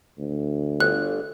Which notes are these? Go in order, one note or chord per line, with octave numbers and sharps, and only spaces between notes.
D2
G1 F#6